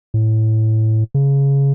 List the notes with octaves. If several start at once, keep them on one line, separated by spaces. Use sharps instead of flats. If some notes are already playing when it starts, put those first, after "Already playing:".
A2
C#3